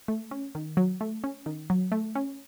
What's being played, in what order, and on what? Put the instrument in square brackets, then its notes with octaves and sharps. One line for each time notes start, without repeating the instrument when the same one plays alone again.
[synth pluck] A3
C#4
D#3
F#3
A3
C#4
D#3
F#3
A3
C#4